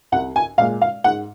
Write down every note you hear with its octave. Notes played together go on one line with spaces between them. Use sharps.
C2 F#5
G#5
A#2 G#3 F5
F5
G#2 F#5